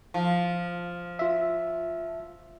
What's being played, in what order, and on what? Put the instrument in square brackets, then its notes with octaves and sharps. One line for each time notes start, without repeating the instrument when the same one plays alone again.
[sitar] F3
[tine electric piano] F4 E5